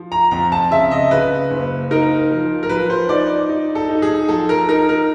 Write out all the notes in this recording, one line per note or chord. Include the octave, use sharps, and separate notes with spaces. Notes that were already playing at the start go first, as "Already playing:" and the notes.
Already playing: F3
A#5
F2 A#5
A5
C#3 E5
D#5
C#3 B4
F#1
D#4 A#4
F3
A#4
F3 B4
C5
D#4 D5
D#4
A4
D#4
G#4
F3 A4
A#4
D#4 A#4
A#4